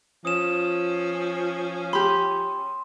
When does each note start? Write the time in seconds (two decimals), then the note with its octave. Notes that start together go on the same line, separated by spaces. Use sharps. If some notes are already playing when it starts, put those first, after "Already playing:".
0.25 F3 C#4 D#6 E7
1.93 G4 B5 C6